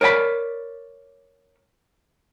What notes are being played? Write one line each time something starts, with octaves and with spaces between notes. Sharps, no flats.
A#4 C#5 D5 G5 B5